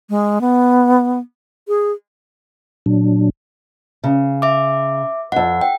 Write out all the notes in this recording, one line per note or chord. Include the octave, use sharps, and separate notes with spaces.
G#3
B3
G#4
A#2 F#3 D4
C#3
E5 D6
F2 G#2 F#5
G5